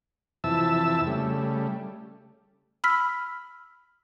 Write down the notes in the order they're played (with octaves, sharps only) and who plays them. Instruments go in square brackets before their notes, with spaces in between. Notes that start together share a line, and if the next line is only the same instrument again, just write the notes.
[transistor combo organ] F2 C3 E3 E5 A5 E6
C#3 G3 A3
[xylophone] B5 E6 F6 B6